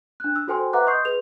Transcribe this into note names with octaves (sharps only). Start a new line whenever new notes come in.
D4 F#6
E6
F#4 A4 C5 G5 G#5 C6
B4 E5 F#5 A#5 D6 F#6
D#5 C6 C#6 D#6 G6 C7
G#4 B4 F7